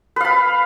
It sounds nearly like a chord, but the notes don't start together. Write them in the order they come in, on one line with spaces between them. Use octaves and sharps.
B4 F5 B5